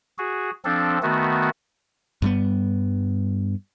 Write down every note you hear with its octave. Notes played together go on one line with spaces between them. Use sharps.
F#4 G#4
F3 C4 D4 A4
D#3 A3 B3 F#4
G2 G3 B3